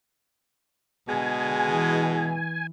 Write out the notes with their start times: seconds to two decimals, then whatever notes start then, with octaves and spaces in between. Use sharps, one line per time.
1.09 B2 D3 G#3 G#5
1.71 E3